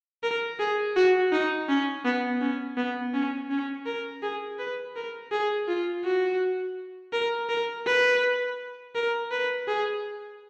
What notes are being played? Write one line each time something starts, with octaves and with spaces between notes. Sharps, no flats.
A#4
G#4
F#4
D#4
C#4
B3
C#4
B3
C#4
C#4
A#4
G#4
B4
A#4
G#4
F4
F#4
A#4
A#4
B4
A#4
B4
G#4